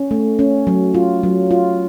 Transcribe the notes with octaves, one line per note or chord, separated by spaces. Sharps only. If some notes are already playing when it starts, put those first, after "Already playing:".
Already playing: C#4
A3
C#4
F#3
F4
F#3
F4